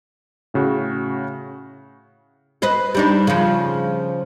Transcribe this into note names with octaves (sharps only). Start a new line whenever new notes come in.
A2 C#3 F#4
B4 C5 D#5
G3 D4 D#4
C#3 F3